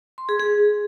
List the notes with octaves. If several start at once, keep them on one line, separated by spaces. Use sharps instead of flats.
C6
G#4
G#4